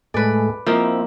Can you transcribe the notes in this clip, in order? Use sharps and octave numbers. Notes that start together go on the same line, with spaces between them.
A2 G#3 A3 B4 D5
F3 A#3 C4 D#4 E4